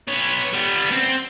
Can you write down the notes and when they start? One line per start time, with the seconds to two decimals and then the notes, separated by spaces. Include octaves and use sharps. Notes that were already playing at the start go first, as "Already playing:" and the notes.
0.08 B3 C#5
0.53 G3 B3
0.92 C4